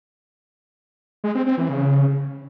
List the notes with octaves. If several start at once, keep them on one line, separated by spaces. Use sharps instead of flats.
G#3
C4
C4
E3
C#3